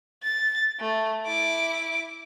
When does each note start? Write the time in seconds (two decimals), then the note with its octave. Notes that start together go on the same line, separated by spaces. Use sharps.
0.23 A6
0.80 A3
1.26 E4 D6